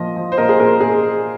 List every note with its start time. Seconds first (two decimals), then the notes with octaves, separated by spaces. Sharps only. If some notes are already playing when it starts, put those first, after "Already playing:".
Already playing: A#2 F3 D#5
0.16 F3
0.32 C5
0.37 A#2 A#4 D#5
0.49 G#4
0.60 A#2 A#4
0.80 A#2 G#4